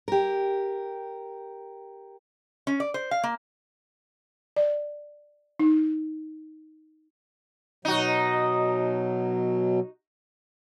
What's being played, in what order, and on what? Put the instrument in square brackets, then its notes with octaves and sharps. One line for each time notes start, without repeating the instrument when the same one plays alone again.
[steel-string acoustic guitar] G4 A#4
[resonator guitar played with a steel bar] C#4
D5
C5
F5
A#3
[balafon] D5
D#4
[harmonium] B2 F#3 [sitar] D#4 F#4